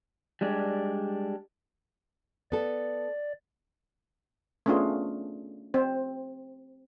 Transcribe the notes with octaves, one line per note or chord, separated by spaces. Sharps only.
G3 G#3 D4
B3 A4 D5
A3 B3 C#4 D4 F4 G#4
C4 C5